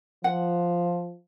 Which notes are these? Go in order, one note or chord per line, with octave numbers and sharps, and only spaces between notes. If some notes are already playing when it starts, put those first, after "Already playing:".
F3 F#5